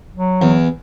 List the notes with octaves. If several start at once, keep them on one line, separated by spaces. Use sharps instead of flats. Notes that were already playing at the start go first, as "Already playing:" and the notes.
F#3
E2